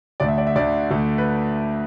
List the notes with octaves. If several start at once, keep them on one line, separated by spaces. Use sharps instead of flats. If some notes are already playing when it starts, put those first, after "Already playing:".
D2 D3 A3 D5
E5
D5
E5
D2 D3 A3 D5
D2 D3 A3
B4